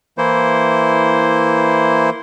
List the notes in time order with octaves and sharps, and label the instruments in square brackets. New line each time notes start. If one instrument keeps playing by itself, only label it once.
[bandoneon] E3 A#3 E4 C5